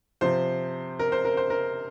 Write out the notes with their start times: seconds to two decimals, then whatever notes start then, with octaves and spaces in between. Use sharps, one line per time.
0.21 C3 F3 C5
0.99 A#4
1.12 C5
1.25 A#4
1.37 C5
1.50 A#4